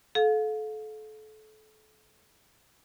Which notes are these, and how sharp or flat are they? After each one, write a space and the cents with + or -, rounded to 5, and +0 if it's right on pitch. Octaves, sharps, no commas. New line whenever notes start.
A4 -30 F5 +30